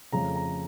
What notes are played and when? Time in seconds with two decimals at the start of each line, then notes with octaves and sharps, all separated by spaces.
0.12 F2 C#3 A3 A#5
0.36 A#5